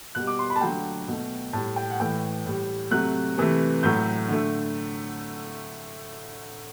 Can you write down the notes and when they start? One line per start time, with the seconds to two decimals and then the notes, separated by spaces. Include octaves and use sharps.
0.15 B2 G3 F#6
0.27 D6
0.39 C6
0.50 B5
0.56 A5
0.61 D3 F#3 A3 G5
1.08 B2 A3
1.53 A2 G3 A5
1.76 G5
1.90 F#5
2.00 A2 E3 A3 G5
2.46 A2 G3
2.91 C3 F#3 A3 F#6
3.38 C3 E3 A3
3.83 A2 F#3 A3 G6
4.29 D3 A3